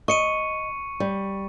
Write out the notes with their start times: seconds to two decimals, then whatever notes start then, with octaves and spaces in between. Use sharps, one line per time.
0.08 D#5 C#6 C#7 D#7
1.00 G3